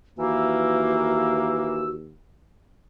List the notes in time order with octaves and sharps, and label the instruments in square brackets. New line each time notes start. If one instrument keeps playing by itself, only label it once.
[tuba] D#2 [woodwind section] E3 A#3 [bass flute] F#4 [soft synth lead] E6